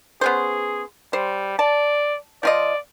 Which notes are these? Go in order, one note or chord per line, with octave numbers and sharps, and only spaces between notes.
B3 C#4 G#4 C5
G3 C5
D5 A5
F3 F4 D5 D#5